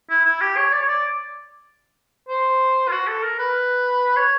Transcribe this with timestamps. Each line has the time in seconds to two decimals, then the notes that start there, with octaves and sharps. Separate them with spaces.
0.10 E4
0.25 E4
0.41 G4
0.57 C#5
0.72 D5
0.81 C#5
0.88 D5
2.29 C5
2.88 F4
2.92 F#4
3.07 A4
3.23 A#4
3.39 B4
4.17 C#5